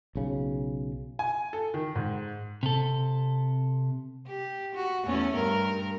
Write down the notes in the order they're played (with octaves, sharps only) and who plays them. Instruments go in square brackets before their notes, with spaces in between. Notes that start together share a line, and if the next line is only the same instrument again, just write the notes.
[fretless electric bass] B1 C#3
[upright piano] G#5
A4
D#3
G#2
[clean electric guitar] C3 A4
[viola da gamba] G4
F#4
E2 A3 C#4
G2 A#4